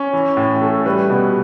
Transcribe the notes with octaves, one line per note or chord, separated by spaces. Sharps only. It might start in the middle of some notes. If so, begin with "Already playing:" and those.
Already playing: C#4
E3
A2
A3
G3 B4
B2